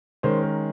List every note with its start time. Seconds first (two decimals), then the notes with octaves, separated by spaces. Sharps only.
0.23 D#3 G#3 C#4 C5
0.42 A#4